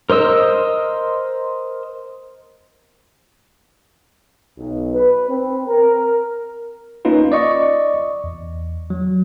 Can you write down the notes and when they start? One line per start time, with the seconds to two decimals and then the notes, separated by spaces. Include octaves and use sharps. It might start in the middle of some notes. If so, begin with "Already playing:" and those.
0.10 A#4 C5 D#5 E6
4.58 B1
4.94 B4
5.29 C4
5.67 A#4
7.05 A#3 C#4 D#4 F4 B4
7.32 D5 D#5 C#6
8.24 E2
8.90 F#3